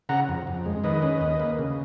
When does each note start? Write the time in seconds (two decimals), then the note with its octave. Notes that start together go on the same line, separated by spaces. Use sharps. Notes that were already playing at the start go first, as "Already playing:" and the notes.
0.09 C#3 F#5 A#5
0.29 F2
0.47 F2
0.66 G#3
0.84 D#3 B4 D#5
1.02 C#4
1.21 D#2
1.40 A#3
1.59 C#3